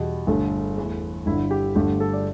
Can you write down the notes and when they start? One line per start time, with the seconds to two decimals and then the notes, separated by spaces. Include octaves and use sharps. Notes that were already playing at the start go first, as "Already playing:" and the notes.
Already playing: E2 B2 G3
0.27 G1 G2 D3 A3
0.77 E2 E3 A3
1.26 G1 G2 D3 E4
1.51 G4
1.75 G1 G2 D3 A3 G4
2.00 A4
2.13 D5